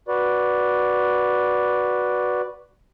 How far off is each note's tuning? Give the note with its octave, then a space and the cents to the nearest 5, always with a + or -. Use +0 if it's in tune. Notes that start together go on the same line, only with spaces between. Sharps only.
F#4 +0 B4 -5 D5 +0